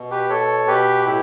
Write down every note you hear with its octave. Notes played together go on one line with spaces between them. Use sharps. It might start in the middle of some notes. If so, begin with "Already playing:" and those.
Already playing: B2
G4 B4
B2 A4 C#5
B2 G4 B4
A2 E4 G4